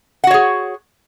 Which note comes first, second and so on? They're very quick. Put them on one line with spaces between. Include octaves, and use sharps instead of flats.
F#5 F#4 C#5 G#4